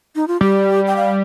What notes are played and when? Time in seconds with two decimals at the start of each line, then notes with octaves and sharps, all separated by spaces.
0.16 D#4
0.28 F4
0.41 G3 G4
0.87 G5
0.96 F5